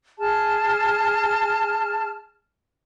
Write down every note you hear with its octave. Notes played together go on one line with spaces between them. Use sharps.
G#4 A5 F6